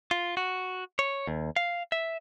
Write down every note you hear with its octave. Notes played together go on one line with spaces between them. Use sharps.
F4
F#4
C#5
D#2
F5
E5